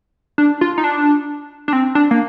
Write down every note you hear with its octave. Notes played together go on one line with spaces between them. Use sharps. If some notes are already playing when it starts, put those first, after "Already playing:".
D4
F4
D#4
D4
D4
C4
D4
A#3